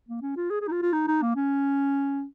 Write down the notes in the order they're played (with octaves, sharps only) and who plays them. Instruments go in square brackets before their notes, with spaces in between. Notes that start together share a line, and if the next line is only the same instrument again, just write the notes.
[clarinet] A#3
C#4
F4
G#4
G#4
D#4
F4
F4
D#4
D#4
A#3
C#4